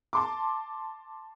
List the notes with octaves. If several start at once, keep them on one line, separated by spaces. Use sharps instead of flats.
A5 C6 D6